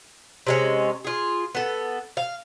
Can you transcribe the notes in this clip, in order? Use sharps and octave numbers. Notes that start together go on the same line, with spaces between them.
C3 G#3 C#4
F4 G#4
B3 A4
F5